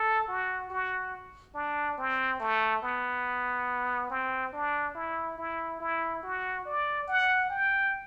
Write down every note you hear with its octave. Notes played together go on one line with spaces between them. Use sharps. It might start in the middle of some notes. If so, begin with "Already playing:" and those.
Already playing: A4
F#4
F#4
D4
C4
A3
B3
C4
D4
E4
E4
E4
F#4
D5
F#5
G5